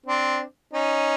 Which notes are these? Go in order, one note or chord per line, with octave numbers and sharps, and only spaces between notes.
C4 D4
C#4 D#4